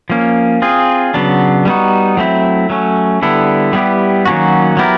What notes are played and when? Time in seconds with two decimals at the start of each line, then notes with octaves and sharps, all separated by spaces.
0.10 F3 A#3 C#4
0.62 C4 F4 G#4
1.14 C#3 F#3 B3 D4
1.65 G3 B3 D#4 F#4
2.17 F#3 A3 C4 E4
2.70 F#3 A3 C#4
3.22 D3 G3 B3 E4 A4
3.73 G3 B3 E4 G4
4.25 D#3 F#3 A#3 C#4 F#4
4.77 F#3 B3 E4 G4 A#4